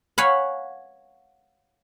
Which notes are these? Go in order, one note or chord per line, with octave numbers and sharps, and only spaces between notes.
C#5 F5 F#5 G#5 B5